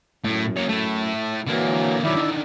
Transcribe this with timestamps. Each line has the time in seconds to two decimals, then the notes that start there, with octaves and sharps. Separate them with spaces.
0.24 F#2 A2
0.57 A#3 C#5
0.69 A3 E4
1.47 D3 E3 F#3 A#3
2.04 D#3 F#3 E4 D5 E5
2.17 D3 D#3